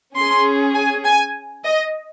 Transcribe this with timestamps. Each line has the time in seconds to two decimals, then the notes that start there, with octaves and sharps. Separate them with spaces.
0.16 C#4 G#4 C6
0.75 G#5
1.05 G#5
1.65 D#5